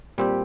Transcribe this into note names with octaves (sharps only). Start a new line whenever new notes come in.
A#2 G3 C4 G4